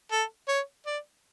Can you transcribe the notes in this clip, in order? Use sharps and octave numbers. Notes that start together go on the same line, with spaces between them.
A4
C#5
D5